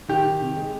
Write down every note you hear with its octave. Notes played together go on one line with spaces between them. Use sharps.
D#3 G4
D#3
C3
G#3